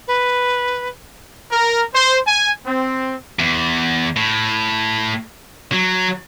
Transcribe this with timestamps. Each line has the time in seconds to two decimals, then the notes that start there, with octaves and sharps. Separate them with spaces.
0.07 B4
1.51 A#4
1.94 C5
2.27 G#5
2.66 C4
3.39 E2
4.17 A2
5.72 F#3